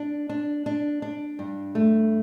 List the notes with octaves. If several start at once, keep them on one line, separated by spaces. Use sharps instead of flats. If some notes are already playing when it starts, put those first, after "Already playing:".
Already playing: D4
D4
D4
D4
G2
A3